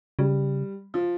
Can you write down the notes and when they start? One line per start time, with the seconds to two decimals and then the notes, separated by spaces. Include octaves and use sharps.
0.19 C#3 G3
0.94 F3